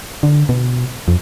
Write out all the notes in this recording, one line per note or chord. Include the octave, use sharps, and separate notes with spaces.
D3
B2
F2